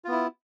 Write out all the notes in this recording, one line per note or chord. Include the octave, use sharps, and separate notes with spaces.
B3 E4 F4